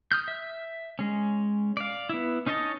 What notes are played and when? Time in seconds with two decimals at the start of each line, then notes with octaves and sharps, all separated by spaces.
0.12 D#6 F6 G6
0.28 E5
0.99 G#3 C#4
1.77 D5 F5
2.09 B3 E4
2.46 C#4 D#4 C#5 D#5 A5